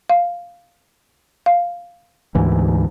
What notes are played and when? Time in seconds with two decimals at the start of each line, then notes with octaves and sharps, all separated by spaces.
0.10 F5
1.46 F5
2.35 D2 G#2 E3